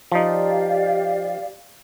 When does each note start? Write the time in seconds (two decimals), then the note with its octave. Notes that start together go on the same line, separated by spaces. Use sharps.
0.12 F3 D#4 G4 D5 F5